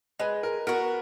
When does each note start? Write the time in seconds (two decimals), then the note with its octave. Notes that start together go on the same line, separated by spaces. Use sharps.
0.20 G#3 B4
0.43 A#4
0.67 B3 F#4 A#4